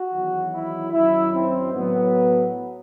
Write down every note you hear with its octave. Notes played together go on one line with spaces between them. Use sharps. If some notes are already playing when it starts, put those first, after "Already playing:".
Already playing: F#4
E2 D#3 F#3
E4
F#2 D#3 F#3 E4
C4
A2 F#3 B3